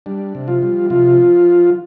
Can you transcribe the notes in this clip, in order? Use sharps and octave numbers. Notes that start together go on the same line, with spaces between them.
G3 D4
C3
F3 F4
G3
C3 F3 F4